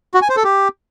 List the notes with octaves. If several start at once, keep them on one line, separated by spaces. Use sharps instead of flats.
F#4
G#5
C5
A4
G4